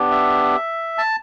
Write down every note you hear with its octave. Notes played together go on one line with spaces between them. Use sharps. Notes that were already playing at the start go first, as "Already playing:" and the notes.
Already playing: B3 D4 G4
E5
A5